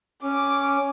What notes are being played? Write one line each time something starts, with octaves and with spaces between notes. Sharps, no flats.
C#4 D6